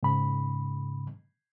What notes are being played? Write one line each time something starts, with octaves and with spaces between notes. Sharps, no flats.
G#2 C#3 B5